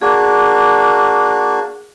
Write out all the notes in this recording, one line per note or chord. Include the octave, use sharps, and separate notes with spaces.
A#3 D4 F#4 G#4